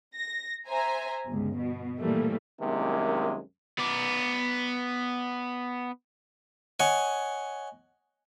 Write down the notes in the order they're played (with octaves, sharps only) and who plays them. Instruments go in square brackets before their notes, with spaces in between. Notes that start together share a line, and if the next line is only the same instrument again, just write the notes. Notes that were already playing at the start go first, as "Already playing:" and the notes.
[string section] A#6
C5 E5 G#5 A#5
G1 C#2
B2
A#2 E3 F3 G3 A3 A#3
[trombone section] C2 F#2 C3 D#3 G#3 A#3
[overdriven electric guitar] B3 D5
[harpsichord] C#5 D#5 F#5 G#5